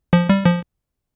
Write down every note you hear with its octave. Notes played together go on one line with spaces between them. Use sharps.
F3
G3
F3